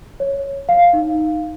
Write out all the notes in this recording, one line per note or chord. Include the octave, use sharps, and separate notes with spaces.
C#5
F5
D#4